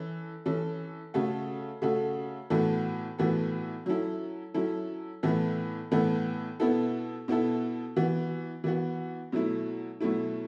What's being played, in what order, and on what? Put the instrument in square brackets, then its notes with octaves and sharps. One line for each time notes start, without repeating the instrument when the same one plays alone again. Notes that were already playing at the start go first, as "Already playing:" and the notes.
Already playing: [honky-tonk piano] E3 C#4 A4
E3 C#4 A4
C#3 A3 F#4 A4
C#3 A3 F#4 A4
A2 E3 B3 F#4 A4
A2 E3 B3 F#4 A4
F#3 C#4 E4 A4
F#3 C#4 E4 A4
A2 E3 B3 A4
A2 E3 B3 A4
B2 B3 E4 A4
B2 B3 E4 A4
E3 B3 F#4
E3 B3 F#4
B2 F#3 A3 E4
B2 F#3 A3 E4